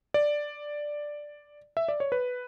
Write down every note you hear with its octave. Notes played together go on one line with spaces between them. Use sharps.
D5
E5
D5
C#5
B4